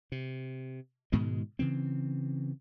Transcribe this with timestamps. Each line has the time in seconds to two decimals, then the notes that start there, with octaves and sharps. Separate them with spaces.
0.12 C3
1.12 G#2 B2 D#3 G#3
1.59 C#3 E3 C4